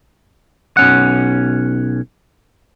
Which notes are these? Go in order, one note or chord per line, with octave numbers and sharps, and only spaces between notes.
B1 C#4 F#5